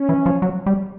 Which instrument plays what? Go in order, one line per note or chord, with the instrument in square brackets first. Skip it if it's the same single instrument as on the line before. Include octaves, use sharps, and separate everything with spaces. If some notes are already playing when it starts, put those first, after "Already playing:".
Already playing: [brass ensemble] C#4
[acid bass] E3
F3
F#3
G3